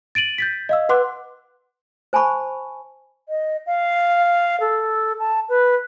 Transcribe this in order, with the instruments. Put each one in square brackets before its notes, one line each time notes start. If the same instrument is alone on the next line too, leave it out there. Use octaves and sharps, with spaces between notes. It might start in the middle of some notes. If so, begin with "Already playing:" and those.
[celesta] A6 D7 D#7 F#7
G6 A6 B6
D#5 F5 E6
B4 F#5 C6 D6 F#6
[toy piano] C5 G#5 A5 B5 C#6
[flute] D#5
F5
A4
A5
B4